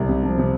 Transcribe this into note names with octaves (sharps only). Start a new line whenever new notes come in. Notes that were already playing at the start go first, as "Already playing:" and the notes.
Already playing: C2
C3
F3
C3